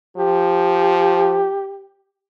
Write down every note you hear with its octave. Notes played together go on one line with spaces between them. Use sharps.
F3 G4